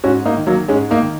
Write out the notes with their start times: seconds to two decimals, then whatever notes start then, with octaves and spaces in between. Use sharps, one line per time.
0.04 G#2 C#4 F#4
0.25 A#3 D#4
0.36 D#3
0.47 F#3 A#3
0.68 G#2 G#3 C#4
0.91 A#3 D#4
1.01 D#3